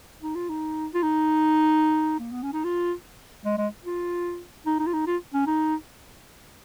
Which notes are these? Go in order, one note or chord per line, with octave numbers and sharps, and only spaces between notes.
D#4
F4
D#4
F4
D#4
A#3
B3
C#4
D#4
F4
G#3
G#3
F4
D#4
D#4
F4
D#4
F4
C#4
D#4